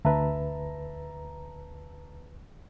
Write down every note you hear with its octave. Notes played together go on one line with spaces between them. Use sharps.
D2 B4 E5 A5 A#5